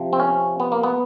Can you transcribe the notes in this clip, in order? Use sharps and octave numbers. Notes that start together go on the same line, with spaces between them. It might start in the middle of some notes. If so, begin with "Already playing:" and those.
Already playing: C3 F3
C4
C#4
B3
A#3
B3